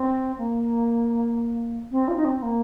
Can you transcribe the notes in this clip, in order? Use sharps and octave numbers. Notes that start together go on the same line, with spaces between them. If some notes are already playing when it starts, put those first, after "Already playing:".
Already playing: C4
A#3
C4
F4
D#4
C4
A#3